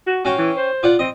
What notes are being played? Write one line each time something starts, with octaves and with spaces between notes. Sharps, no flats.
F#4
C#4 F#4 F5 G5
E3
C5
F4 D5 F#5
C4 D#5